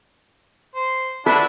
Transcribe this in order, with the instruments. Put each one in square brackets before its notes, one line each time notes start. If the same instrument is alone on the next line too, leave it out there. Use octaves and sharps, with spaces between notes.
[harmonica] C5
[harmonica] D4 E4 F#4 [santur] B4